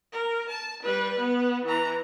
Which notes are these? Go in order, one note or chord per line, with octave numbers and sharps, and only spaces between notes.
A#4
A5
G3 B4
B3
E3 A#5